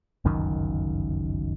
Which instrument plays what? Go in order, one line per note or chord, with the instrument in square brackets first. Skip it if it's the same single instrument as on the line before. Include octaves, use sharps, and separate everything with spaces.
[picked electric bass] G1 C#2 F#2 D#3